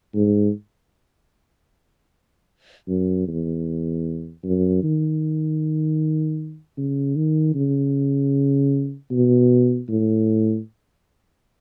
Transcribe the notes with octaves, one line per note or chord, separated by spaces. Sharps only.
G#2
F#2
E2
F#2
D#3
C#3
D#3
C#3
B2
A2